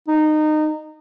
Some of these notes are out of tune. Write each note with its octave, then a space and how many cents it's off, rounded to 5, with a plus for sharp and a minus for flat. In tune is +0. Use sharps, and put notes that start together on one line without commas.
D#4 -20